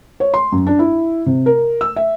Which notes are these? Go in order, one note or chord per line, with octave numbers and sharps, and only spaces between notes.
C#5
C6
F#2
D4
E4
C3
A#4
E6
E5